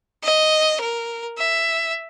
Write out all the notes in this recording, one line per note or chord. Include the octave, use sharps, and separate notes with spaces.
D#5
A#4
E5